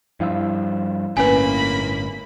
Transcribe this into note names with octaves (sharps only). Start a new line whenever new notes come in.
G2 F3 E4 F5 E6
G1 A2 A#3 C#4 B4 G#5 B5